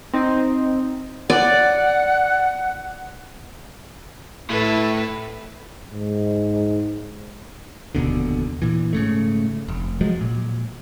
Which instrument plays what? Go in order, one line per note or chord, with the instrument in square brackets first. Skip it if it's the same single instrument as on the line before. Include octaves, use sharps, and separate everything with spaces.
[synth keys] C4 D#4
[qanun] D5 [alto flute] F#5
[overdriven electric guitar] A2 [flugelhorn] E4 [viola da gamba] A4 B4
[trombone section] G#2
[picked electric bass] F1 D#2 B2 D3
A#2 E3
G#2 C#3 A3
F1
F3 F#3 G#3
A#2